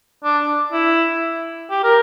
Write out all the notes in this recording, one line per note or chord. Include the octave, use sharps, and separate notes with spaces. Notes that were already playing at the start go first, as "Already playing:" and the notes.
D4
E4
G4
A#4